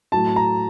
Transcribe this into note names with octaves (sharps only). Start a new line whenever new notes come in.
A2 F#3 A5
A#5